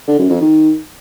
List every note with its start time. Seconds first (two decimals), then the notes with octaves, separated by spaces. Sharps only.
0.07 D3
0.19 F#2
0.30 F2
0.41 D#3